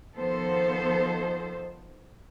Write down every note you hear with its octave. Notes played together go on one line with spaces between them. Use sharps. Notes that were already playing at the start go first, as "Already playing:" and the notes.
D#3 F3 B3 A4 C5